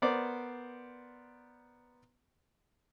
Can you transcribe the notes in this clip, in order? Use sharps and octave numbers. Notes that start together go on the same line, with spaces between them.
B3 A#4 C5 D5